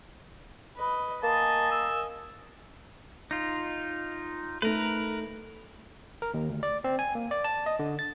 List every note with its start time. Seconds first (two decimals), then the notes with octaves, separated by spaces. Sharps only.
0.77 B4 D#5
1.23 A#3 D#5 G#5 A5
1.71 E6
3.31 D#4 F4
4.62 A3 D#4 A#4 B4
6.22 A#4
6.34 D#2
6.49 D2
6.63 D5
6.84 C4
6.99 G#5
7.15 A#3
7.31 D5
7.44 A5
7.66 D#5
7.79 D3
7.99 A6